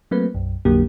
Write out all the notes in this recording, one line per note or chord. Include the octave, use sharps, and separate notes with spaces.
F#3 A3 A#3 C4 B4
B1 F#2
A#1 F2 D3 F#3 A#3 G4